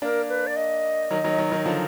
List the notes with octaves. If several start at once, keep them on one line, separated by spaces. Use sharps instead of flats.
A#3 D4 A#4
B4
D5
D#5
D#3 F#3
D#3 F#3
D#3 F#3
D#3 F#3
D3 F3